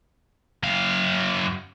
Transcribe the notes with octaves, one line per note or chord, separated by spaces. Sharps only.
F#2 F5